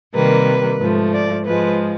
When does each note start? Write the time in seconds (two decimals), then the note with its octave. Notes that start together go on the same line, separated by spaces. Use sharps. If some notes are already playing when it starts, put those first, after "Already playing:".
0.14 C3 D#3 G3 A#3 B4
0.79 G#2 F3 A3
1.12 D5
1.45 G#2 F3 G#3 B4